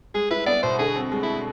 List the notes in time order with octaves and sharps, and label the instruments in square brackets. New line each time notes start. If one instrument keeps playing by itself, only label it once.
[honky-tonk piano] G#3 [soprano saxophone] G#4
[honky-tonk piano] E4 [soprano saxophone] B4
[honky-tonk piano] B3 [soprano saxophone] D5
[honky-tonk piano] B2 [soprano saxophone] C5
[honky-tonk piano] D3 [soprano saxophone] G#4
[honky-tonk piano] C4
G#3
[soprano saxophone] E4